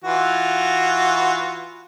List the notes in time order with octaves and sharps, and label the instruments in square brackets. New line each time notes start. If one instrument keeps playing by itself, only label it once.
[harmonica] E3 F4 F#4